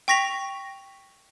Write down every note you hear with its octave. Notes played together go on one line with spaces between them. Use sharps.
G5 C#6 A#6 B6 F7